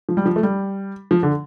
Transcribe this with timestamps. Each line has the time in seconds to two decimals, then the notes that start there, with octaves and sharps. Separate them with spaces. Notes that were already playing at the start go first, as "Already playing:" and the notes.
0.09 F3
0.17 G3
0.26 F3
0.36 A3
0.43 G3
1.11 F3
1.23 D3